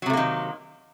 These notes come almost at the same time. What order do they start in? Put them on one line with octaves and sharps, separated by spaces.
F#3 C3 A3 A#3 D#3